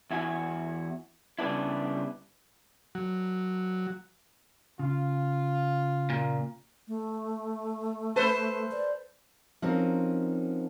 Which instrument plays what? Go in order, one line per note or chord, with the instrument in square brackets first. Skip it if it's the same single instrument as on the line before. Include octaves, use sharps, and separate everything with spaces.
[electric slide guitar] E2 E4 F#4 G#5
C#3 G3 B3 D4 E4
[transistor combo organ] F#3
[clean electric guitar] C#3 [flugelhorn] F4
[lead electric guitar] A#2
[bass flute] A3
[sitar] A4 B4 C5
[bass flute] D5
[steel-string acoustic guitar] F3 C4 C#4 D#4 F#4 A#4